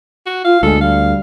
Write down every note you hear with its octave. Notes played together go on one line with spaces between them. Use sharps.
F#4
F4 F5
D2 G#3 A4
G3 F5